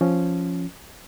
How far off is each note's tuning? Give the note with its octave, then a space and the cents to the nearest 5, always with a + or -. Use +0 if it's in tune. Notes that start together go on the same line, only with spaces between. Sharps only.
F3 +0 C#4 +0